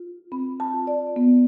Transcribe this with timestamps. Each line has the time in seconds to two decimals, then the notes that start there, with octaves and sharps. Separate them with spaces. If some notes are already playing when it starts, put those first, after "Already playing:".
Already playing: F4
0.32 C4 B5
0.60 A5
0.73 F4
0.87 D5
1.16 B3